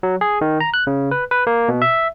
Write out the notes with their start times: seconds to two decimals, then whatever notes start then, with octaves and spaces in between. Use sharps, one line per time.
0.03 F#3
0.21 G#4
0.41 D#3
0.60 A#5
0.74 F#6
0.87 C#3
1.11 B4
1.31 B4
1.47 A#3
1.68 B2
1.82 E5